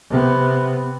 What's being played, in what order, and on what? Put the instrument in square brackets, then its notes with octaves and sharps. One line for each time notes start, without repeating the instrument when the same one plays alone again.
[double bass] C3 B3